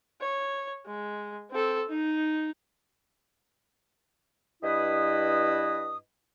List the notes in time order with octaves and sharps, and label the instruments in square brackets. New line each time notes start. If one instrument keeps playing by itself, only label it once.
[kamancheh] C#5
G#3
C4 A4
D#4
[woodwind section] G2 E4 B4 D#5 D#6